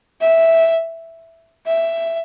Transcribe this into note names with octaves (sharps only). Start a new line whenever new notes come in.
E5
E5